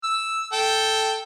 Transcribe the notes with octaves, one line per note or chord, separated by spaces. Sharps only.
E6
A4 G5